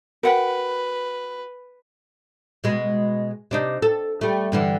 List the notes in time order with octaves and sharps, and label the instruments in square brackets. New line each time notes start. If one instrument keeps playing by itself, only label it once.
[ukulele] F#4 F#5 G5 [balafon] A#4 [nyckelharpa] B4
[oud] B2 G#3
C3 D4 D#4
A4
G3 A3
G2 D3 E3